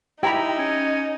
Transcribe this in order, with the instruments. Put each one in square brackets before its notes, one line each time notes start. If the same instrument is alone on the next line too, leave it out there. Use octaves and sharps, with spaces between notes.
[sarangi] D#4 [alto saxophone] E4 [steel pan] G4 A#5 B5 [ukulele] G5
[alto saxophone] C#4